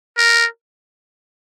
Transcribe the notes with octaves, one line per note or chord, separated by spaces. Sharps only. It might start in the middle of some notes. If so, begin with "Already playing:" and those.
A#4